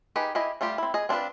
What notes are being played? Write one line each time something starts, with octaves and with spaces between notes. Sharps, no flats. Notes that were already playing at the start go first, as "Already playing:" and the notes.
D#4 G4 G#4 B4
E4 G4 G#4 D#5
G3 A3 F4 G4
C4 E4
G#4 D#5
C4 D4 E4 F4 B4